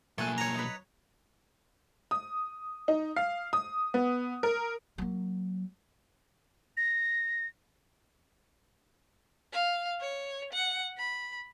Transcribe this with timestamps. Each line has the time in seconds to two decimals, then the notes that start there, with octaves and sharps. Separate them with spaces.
0.18 B1 A3 A#3 G#5 A5 F#6
0.38 C#5 A#5
0.55 D#4 B4
2.11 D#6
2.88 D#4
3.16 F5
3.53 D#6
3.94 B3
4.43 A#4
4.98 F#3 A#3
6.77 A#6
9.53 F5
10.01 C#5
10.53 F#5
10.98 B5